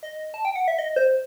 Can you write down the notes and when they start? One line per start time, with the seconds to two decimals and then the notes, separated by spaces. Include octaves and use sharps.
0.03 D#5
0.34 A5
0.45 G5
0.55 F#5
0.68 E5
0.78 D#5
0.96 C5